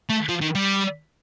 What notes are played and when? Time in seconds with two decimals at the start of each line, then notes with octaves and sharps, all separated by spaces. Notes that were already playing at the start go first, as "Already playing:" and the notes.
0.10 A3
0.29 F3
0.41 D#3
0.55 G3